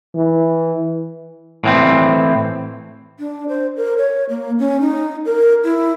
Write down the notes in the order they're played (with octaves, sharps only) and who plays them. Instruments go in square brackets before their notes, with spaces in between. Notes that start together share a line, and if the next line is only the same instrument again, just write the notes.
[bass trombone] E3
[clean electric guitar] A2 E3 C4
[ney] D4
C5
A#4
C#5
A#3
C#4
D#4
A#4
E4